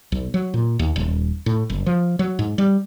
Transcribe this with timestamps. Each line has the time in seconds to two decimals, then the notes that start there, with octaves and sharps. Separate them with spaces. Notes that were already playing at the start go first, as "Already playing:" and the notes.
0.12 B1
0.34 F#3
0.54 A#2
0.79 D#2
0.96 D#1
1.46 A2
1.70 F#1
1.86 F3
2.19 F#3
2.39 G#2
2.58 G3